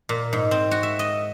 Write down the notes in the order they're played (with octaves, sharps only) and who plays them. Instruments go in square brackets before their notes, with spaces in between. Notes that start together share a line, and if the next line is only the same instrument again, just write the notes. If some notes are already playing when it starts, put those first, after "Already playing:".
[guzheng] A#2
G#2
C4
F#4
E5
D#5